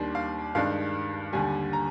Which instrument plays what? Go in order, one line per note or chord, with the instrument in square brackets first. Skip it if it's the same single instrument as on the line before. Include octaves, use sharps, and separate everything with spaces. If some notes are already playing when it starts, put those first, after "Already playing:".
Already playing: [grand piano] D#2 D#3 G3 D4 C6
F5
G2 D#3 G#3 D4 F5
D#2 D3 G3 G#5
A#5